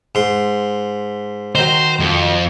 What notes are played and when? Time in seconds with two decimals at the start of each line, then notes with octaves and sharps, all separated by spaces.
0.15 G#2 C6
1.55 D#3 F#3 C5
2.00 F2